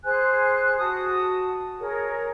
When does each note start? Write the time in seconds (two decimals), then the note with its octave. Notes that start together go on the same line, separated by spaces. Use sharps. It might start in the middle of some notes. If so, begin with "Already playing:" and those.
0.04 G#4 C5 G#5 F#6
0.79 F#4 A5 D#6
1.80 G#4 A#4 C#5